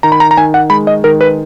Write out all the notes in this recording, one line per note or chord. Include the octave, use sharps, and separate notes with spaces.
D#3 A#5
B5
A#5
A#5
D#3 G#5
F#5
G#3 B5
D#5
D#3 A#4
B4